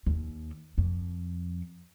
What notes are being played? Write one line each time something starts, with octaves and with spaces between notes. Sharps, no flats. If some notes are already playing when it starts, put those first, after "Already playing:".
D#2
F2